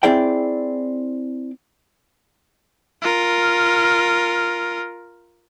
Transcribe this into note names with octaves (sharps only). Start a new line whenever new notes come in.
C4 E4 G#4 D5 G5
F4 A#4